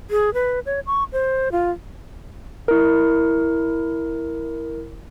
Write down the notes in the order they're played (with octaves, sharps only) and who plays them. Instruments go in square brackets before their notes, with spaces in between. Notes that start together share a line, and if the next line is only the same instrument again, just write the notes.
[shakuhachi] G#4
B4
C#5
C#6
C5
F4
[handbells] E4 A#4